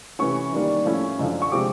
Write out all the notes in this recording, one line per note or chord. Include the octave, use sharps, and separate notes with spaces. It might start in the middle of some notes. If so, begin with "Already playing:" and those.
C3 E3 A3 C#4 C#6
D#3 G3 A#3 D4
A2 F3 A3 C#4 E4
F#2 D3 F3
C#6
C3 F3 G#3 C4 D6